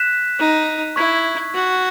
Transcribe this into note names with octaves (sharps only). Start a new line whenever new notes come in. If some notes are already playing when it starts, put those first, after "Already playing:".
Already playing: F#6 B6 E7
D#4
E4 C#6 G#6 B6
F#4